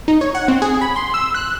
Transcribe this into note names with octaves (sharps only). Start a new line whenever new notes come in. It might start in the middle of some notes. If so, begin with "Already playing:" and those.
D#4
C#5
F#5
C4
G#4
B5
C6
E6
F#6